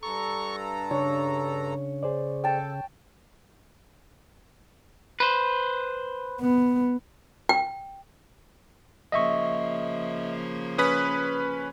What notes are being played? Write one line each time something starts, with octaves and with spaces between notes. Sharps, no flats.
G2 A4 A#5 C#6
C#3 D4 C#5
G#4 C5 D5
A4 G5 A5
B4 C5
B3
G5
C#3 F3 A#3 D#5 E5 C#6
C#4 B4 D#6 B6